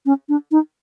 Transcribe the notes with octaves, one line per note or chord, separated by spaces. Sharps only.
C#4
D4
D#4